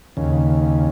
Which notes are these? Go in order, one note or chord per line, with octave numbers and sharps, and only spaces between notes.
D#2 C#3